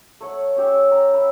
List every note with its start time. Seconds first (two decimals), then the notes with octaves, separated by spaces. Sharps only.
0.20 A3 C#5 F#5
0.56 C#4 G4 E5
0.91 A#5
1.14 B4 E5